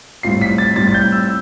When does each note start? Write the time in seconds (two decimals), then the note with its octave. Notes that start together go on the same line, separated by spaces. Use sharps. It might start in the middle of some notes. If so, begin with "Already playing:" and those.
0.23 A2 G3 C4 F4 C7
0.41 B6
0.58 A6
0.76 A2 G3 C4 F4 A6
0.87 A6
0.94 G6
1.12 E6